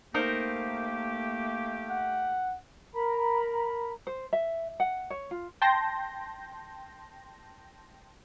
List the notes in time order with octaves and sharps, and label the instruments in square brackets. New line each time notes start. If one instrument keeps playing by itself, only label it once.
[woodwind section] A3 A#3 G4 [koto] D#4 A#4 C5
[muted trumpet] F#5
[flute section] A#4 A#5 B5
[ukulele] C5
E5
F#5
C#5
F4
[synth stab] G5 A5 C6 G6 A#6